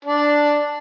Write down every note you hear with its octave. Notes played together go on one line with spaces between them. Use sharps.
D4